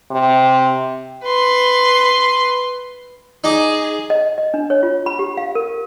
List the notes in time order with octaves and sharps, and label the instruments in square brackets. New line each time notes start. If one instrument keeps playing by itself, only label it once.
[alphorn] C3
[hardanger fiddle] B4 C6
[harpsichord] D#4 D6 [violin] G#4
[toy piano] D#5
D#5
D4
C#5
F4
B5
G4
F5
A#4